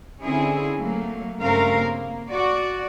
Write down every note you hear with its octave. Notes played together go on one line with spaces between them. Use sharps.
D3 C4 C#4 E4 G#4
F#3 A3 A#3
G2 C#3 A3 C4 A#4 F5
A#3
F#4 D5